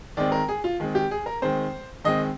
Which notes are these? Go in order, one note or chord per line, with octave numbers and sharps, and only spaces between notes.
D#3 G#3 C4 D5
A#4
G#4
F4
D#3 G#3 C4
G4
G#4
A#4
D#3 G#3 C4 C5
D#3 G#3 C4 D#5